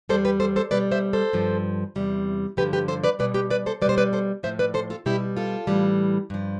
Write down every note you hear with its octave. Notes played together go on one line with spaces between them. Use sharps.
E2 B2 G3 A4 C5
G4 B4
A4 C5
A4 C5
B2 G3 B4 D5
C5 E5
A4 C5
G2 F3
E2 C3 G3
G2 D3 F3 G4 B4
G4 B4
A4 C5
B4 D5
B2 G3 B4 D5
G4 B4
B4 D5
A4 C5
B2 G3 B4 C5 D5
B4 D5
A4 C5
A2 F3 C5 E5
B4 D5
A4 C5
F4 A4
B2 G3 E4 G4
F4 A4
A2 E3 G3
G2 F3